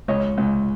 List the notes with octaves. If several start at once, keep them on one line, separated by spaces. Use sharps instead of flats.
C#2 C#5 D#5
C#2